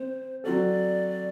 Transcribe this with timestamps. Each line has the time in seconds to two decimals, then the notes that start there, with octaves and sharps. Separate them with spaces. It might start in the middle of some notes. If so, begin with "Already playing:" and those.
Already playing: C4 C5
0.44 F#3 C4 F#4 A4 D5